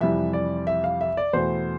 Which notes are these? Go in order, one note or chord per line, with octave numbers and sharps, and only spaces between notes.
F2 C3 E3 G3 E5
D5
E5
F5
E5
D5
E2 B2 A3 C5